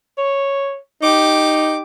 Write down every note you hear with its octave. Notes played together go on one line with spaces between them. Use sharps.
C#5
D#4 G4 D6